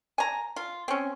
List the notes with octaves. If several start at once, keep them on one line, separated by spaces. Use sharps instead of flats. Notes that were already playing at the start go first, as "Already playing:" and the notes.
G#5 A#5
F4
C4 C#4